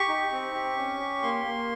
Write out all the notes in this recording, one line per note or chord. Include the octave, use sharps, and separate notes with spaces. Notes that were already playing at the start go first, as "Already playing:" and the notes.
Already playing: G4 C#6
D#4
C4
G4
C#4
G4
A#3 C6
A#3